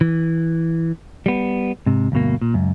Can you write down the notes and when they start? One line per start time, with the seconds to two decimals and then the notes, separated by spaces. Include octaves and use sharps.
0.01 E3
1.26 G3 B3
1.86 G#2 C3
2.12 D2 G2 B2 A#3
2.42 A#2
2.54 C#2 F#2